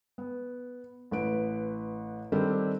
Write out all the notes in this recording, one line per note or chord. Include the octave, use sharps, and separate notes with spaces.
B3
A1 B4 D7
D#3 G3 C4 D4 G4 A4